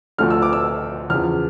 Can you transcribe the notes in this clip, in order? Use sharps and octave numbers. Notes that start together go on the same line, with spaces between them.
D2 D3 F3 A3 F6
E6
D6
E6
E2 C#3 F3 F6